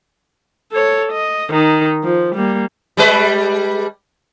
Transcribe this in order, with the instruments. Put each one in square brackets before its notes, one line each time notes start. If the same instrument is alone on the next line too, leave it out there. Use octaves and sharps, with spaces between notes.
[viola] A4 C#5
D#5
D#3 D#4
F3
G3 A#3
[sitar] G3 G#3 B4